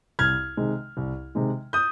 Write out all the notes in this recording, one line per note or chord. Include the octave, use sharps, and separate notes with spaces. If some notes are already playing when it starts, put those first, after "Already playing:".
C2 F6 G#6
C3 D#3 G#3
C2
C3 D#3 G#3
D#6 G6